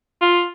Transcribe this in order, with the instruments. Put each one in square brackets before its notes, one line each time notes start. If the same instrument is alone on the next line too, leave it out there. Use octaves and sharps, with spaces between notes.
[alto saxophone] F4